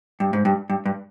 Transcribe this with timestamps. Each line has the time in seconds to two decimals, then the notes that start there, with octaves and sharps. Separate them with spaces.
0.20 G2
0.33 G#2
0.45 G2
0.70 G2
0.86 G2